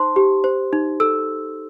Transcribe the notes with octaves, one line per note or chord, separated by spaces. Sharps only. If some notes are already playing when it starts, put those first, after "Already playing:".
Already playing: D#4 C5 A5 C6
G4
C5
D#4
A4 E6